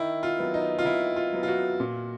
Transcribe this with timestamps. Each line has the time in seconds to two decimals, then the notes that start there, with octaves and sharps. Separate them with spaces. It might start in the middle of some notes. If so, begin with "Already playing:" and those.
Already playing: D#3 E4
0.23 F4
0.39 F#3 B3
0.54 D#4
0.79 F4
0.85 D#3 E4
1.16 F4
1.33 F#3 B3
1.43 F4
1.48 F#4
1.80 A#2